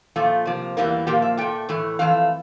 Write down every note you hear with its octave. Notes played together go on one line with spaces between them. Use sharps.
A#2 F3 A3 F4
C3 F3 A#3
E2 E3 G3 A#3
A#2 F3 A#3 G4
E5
A#2 A3 G5
A2 E3 A3
F2 E3 A3 F5